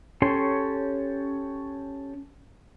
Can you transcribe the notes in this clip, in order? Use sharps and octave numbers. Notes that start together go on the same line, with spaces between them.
C#4 G4 A4 C#5 C6